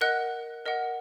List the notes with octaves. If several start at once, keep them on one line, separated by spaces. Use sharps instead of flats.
A#4 D#5 F#5 F#6
A#4 D#5 F#5